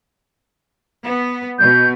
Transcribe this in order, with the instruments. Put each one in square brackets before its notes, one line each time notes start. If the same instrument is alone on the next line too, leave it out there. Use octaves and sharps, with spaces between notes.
[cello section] B3
[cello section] B2 [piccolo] G6